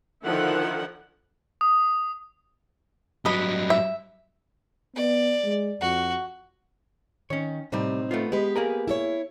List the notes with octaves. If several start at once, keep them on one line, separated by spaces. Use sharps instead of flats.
D3 D#3 F3 E4 F#5
D#6
G2 F#3 B4 D#5 B5
E5
B3 D5
G#3
F2 F#4
D#3 C#4 C#5
A2 C3 G3 C4 D#4
A3 B3 F4
G#3 B3 G4 B4
A#3 G#4 A#4
E4 A4 C#5